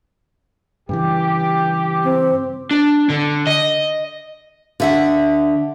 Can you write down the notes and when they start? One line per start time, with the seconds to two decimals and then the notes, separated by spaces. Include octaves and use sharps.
0.89 G2 C#3 E3 G4
2.04 C4
2.71 D4
3.10 D3
3.47 D#5
4.80 D3 E5 F#5